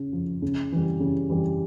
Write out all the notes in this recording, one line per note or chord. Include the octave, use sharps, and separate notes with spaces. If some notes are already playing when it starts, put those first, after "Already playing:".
Already playing: C#3
F3
C#3
E3 G3
C#3
E3 G3